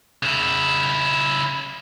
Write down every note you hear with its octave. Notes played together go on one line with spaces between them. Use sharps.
C#3 E4